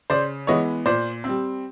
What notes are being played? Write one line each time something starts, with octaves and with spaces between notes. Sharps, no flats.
C#3 C5 D5
E3 G#3 B3 C#5 D#5
A#2 C5 D5
C4
G3